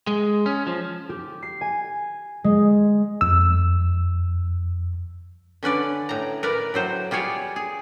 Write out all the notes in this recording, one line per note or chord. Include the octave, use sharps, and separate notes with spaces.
G#3
C#4
F3
G4
C7
G#5
G#3
F2 E6
D3 C#4 B4 D5
A2 A#5
A#4 B4 D5
A2 F#3 C5
G3 F4 G#4 C#5 D5
G#4